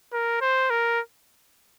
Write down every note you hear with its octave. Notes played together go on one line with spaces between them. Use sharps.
A#4
C5
A#4